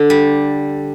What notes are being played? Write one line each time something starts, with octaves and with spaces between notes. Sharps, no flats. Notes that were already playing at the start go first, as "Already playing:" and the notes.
Already playing: D3
G3